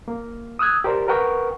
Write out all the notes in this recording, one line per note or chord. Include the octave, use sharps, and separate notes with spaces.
A#3
D#6 E6 F#6 G#6
G4 A#4 C5 D5
A#4 B4 F#5 G5 C#6